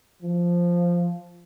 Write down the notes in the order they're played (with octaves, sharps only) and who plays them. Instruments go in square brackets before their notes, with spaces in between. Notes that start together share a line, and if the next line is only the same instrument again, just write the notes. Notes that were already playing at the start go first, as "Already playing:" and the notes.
[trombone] F3